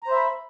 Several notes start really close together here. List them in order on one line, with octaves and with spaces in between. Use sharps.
A#5 C5 E5 B5